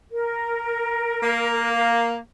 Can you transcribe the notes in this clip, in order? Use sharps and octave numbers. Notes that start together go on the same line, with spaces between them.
A#4
A#3